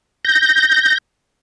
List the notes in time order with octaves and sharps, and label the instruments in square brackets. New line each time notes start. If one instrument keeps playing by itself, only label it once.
[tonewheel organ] G6 A#6